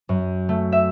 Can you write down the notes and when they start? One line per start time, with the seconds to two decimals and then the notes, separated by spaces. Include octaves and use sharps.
0.09 F#2
0.49 A3
0.72 E5